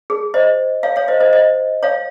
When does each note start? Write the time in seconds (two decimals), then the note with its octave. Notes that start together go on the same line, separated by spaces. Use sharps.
0.10 G#4
0.34 C5 D#5
0.83 C#5 F5
0.96 C#5 F5
1.08 C5 D#5
1.20 C5 D#5
1.33 C5 D#5
1.83 C#5 F5